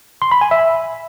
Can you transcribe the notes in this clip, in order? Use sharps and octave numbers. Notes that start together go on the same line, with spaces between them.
C6
B5
G#5
E5